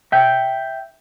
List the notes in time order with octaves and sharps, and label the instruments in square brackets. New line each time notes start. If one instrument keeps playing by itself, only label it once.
[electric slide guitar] E5 G5